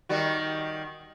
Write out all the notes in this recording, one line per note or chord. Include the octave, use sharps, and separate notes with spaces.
D#3 G3 F#4